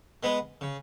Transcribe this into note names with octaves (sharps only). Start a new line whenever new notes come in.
G#3 B3
C#3